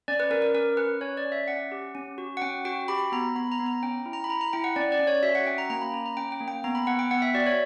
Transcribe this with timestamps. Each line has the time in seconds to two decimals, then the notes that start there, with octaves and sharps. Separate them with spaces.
0.08 C#4 D5
0.20 B4
0.30 C#4 A#4
0.42 A#4
0.54 C#4 A#4
0.77 C#4 B4
1.01 C#4 C#5
1.17 D5
1.25 C#4
1.32 E5
1.48 C#4 F#5
1.72 G4
1.95 C#4
2.18 F#4
2.37 F#5
2.42 C#4 G5
2.65 F#4 G5
2.88 G4 B5
3.12 B3 A#5
3.35 B3 B5
3.52 A#5
3.59 B3
3.66 A#5
3.83 C#4 G5
4.06 E4
4.13 A#5
4.24 B5
4.29 E4 A#5
4.41 A#5
4.53 E4 G5
4.64 F#5
4.76 C#4 D5
4.92 D5
4.99 C#4
5.07 C#5
5.23 F#4 E5
5.35 F#5
5.46 C#4 G5
5.58 A#5
5.70 A#3 A#5
5.82 B5
5.93 C#4 A#5
6.06 A#5
6.17 C#4 G5
6.32 G5
6.40 A#3
6.48 G5
6.64 B3 A#5
6.75 B5
6.87 B3 F#5
6.99 G5
7.11 B3 F#5
7.22 E5
7.34 F#4 D5
7.47 C#5